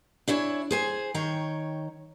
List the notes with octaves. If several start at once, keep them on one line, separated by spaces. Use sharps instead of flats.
D4 E4 C#5 G#5
G#4 C5 G#5
D#3 C#5 G5 A#5